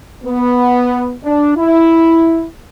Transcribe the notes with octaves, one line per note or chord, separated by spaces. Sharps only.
B3
D4
E4